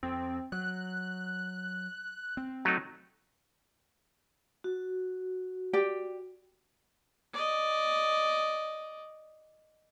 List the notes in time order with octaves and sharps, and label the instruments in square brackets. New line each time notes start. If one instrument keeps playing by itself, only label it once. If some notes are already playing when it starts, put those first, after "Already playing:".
[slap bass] F2 [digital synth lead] C4
[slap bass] F#3 [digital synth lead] F#6
[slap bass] C4
[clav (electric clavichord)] F#3 A3 D#4
[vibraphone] F#4
[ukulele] G4 D5 G5
[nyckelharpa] D5 D#5